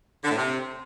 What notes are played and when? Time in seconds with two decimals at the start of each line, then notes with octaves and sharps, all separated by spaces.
0.24 D3
0.30 A2
0.36 C3